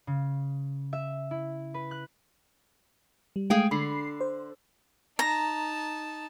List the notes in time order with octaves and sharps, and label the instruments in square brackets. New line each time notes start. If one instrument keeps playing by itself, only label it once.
[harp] C#3
E5
E4
B4
F#6
[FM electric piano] G3
[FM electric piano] G#3 A3 [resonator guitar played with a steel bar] G#4 F5 G5
[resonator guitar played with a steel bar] D3 [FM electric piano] B5 C7
[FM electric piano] C5
[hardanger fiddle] D#4 A5 [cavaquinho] A#5